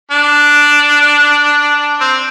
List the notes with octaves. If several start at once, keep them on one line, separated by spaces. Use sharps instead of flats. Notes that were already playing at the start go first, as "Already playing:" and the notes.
D4
C4